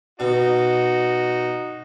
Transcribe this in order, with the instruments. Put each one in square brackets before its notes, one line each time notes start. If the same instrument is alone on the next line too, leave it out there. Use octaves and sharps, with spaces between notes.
[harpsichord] B2 [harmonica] D#4 F#4